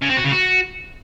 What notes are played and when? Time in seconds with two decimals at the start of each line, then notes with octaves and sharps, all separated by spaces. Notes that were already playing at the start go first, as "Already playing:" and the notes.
0.02 C#3
0.09 C4
0.17 F#4
0.24 C#3
0.32 F#4